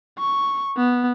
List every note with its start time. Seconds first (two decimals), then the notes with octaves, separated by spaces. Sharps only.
0.19 C#6
0.77 B3